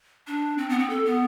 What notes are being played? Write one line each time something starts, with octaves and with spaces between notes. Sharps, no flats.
D4
C4
B3
C4
A4
B3